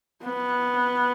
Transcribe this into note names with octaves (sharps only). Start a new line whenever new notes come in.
B3